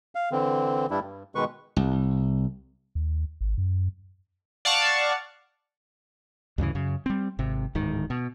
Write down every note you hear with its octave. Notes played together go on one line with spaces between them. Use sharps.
F5
D3 E3 C4
G2 G3 D4 E4
G2
B2 D#3 G#3 B4 C#6
C2
D#2
G#1
F#2
D5 F5 F#5 A5 C#6
D2 G2 C#3 E3
F#2 C#3
G3 C4
G#1 C3
D1 G#2 D#3
B2